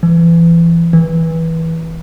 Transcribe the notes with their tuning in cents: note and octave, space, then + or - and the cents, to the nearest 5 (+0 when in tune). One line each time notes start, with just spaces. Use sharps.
E3 +30
E3 -15